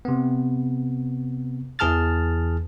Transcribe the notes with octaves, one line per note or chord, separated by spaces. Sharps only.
C3 B3
E2 E3 G#4 A5 F6 A6